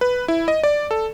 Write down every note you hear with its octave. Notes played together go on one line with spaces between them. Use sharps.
B4
E4
D#5
D5
A4